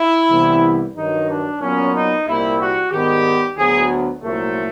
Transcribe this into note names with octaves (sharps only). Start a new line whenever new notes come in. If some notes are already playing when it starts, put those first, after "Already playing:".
Already playing: E4
C2 C3 E3 G3 B3
G2 D#3 F#3 D#4
D4
A#2 F#3 B3 C#4
D#4
C2 A#2 G3 A#3 E4
F#4
G#2 D#3 G3 B3 G4
D2 D3 F#3 B3 G#4
C2 A#2 F#3 A3